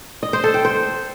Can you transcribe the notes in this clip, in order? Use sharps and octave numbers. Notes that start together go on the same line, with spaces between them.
D#5
C5
A4
G5
C5